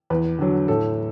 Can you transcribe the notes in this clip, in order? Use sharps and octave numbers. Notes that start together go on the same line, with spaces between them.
E2 B4
D3 F#3
A2 A4